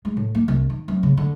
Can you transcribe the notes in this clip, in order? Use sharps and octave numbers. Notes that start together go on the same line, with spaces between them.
G#3
A2
A#3
C2
D#3
F#2
C#3
D3